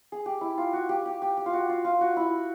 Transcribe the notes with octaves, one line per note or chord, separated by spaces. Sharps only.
G#4
G4
E4
F4
F#4
G4
G4
G4
G4
F4
F#4
F4
F4
F#4
E4